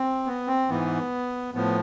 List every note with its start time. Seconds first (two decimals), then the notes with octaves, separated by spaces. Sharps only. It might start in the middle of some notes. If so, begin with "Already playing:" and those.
Already playing: C4
0.26 B3
0.47 C4
0.69 G#2 E3 B3
1.54 A2 F3 B3